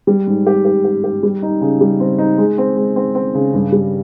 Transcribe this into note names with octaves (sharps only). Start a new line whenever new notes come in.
G3
G#2
G4
G4
G4
G4
G3
D#4
C#3
G3
C4
D#4
G#3
C4
G#3
C4
C4
C#3
G2
G3